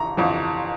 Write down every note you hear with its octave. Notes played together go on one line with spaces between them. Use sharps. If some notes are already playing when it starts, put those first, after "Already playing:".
Already playing: G1 F2 E3 A#5 C#6
G1 F2 E3